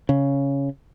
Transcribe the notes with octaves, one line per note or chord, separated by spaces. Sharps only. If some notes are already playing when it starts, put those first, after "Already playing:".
C#3